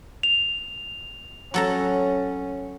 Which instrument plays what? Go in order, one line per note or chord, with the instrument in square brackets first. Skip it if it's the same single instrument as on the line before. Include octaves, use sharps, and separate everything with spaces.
[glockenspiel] F7
[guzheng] F#3 A4 A#5 [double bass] C#4